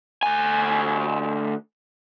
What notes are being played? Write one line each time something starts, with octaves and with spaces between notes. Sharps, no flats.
D2 G#5